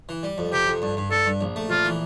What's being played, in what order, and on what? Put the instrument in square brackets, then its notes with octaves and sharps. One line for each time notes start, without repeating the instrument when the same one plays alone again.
[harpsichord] E3
G3
F2
[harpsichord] C3 [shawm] G4
[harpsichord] F2
G2
G2
[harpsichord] G2 [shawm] A4
[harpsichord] G2
A#1
A3
[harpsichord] A#1 [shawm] F4
[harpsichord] E3